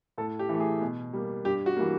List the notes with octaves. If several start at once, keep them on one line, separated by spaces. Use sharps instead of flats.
A2 A4
G4
E3 A3
G#4
B2
G3 A#3
G2 G4
F#4
E3 G3 A#3